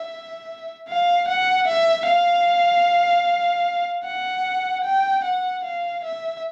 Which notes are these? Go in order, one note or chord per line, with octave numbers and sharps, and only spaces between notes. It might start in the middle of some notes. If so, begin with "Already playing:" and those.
Already playing: E5
F5
F#5
E5
F5
F#5
G5
F#5
F5
E5